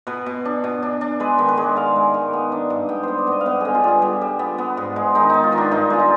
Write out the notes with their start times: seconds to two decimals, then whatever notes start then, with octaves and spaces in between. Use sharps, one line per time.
0.07 B2 B4
0.26 B2
0.45 D4
0.64 B2
0.83 D4
1.01 D4
1.20 G#3 B4
1.38 D#3
1.48 B4
1.57 G#3
1.63 D5
1.76 G#3 F5
1.96 G#3
2.14 D#3
2.33 B3
2.52 D4
2.70 G2
2.89 B3 G5
3.03 B3 C5
3.18 D5
3.27 B3 D#5
3.41 F5
3.46 B3 D#5
3.61 D3 G#4
3.75 F4
3.84 G3 G#4
4.02 G3
4.21 G3
4.39 B3
4.58 B3
4.77 G#2
4.96 G#3
5.15 D#3 D#4
5.30 B3 D#4
5.44 F4
5.52 D#3
5.58 D4
5.71 G2 D#4
5.90 G#3 F4
5.99 D#4